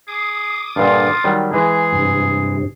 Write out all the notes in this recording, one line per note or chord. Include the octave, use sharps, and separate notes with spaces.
G#4 D6 D#6
G2 A#2 D3 F4
D#3 F#3 G3
E3 G#3 G#4
G2 C3